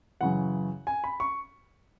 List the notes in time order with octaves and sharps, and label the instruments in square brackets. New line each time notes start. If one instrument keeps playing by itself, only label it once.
[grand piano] F#2 C#3 E3 F#5
G#5
B5
C#6